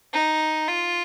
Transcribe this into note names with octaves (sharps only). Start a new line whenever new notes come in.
D#4
F4